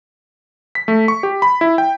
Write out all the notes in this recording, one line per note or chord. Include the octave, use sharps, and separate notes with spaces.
B6
A3
C#6
G4
B5
E4
G5